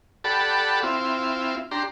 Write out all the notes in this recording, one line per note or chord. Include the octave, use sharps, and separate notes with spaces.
G4 A4 D5 F#5 A5 B5
C4 E4 F4
D4 G4 A#5 C6